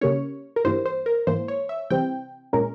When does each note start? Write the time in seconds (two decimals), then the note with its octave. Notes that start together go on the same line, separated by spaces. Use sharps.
0.01 C#3 G3 A#3 C#4 C#5
0.56 A#4
0.65 G2 E3 G3 A#3 C5
0.86 C5
1.06 A#4
1.27 G#2 E3 A#3 C5
1.48 C#5
1.69 E5
1.90 C3 E3 G3 C4 G5
2.53 A#2 G#3 C#4 A#4